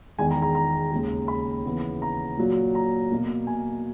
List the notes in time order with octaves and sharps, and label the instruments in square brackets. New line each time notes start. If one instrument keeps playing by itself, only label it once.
[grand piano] E2 D#3 G#3 G#5
A#5
A#5
A#5
D#2 C#3 G#3
B5
D#2 C#3 E3 B3
A#5
A#2 F#3 A#3
A#5
B2 A#3
G#5